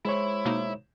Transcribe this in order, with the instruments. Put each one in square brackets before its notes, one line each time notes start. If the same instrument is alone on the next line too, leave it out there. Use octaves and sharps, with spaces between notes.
[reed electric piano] G#3 C5 C#5 [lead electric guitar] E4
[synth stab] B2 A#3 D#4